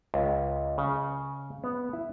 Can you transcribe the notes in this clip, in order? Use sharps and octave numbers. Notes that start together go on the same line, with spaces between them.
C#2
C#3
B3
E4